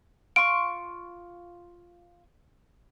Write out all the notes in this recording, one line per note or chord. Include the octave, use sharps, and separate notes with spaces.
F4 C6 C#6 D7